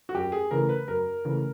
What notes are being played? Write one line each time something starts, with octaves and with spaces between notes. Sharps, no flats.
F#4
F#2 G4
G#4
C#3 E3 A3 A#4
B4
F#2 A#4
C#3 E3 A3